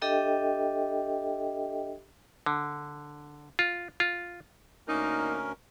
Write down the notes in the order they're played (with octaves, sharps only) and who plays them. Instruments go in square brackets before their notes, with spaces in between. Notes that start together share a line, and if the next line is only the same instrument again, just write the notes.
[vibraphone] D4 G4 A4 D#5 E5 G5
[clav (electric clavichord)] D3
F4
F4
[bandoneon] D2 C#4 A#4 [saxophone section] A#3 D#4